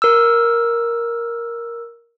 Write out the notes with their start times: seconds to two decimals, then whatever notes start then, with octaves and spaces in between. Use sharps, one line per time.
0.02 A#4 E6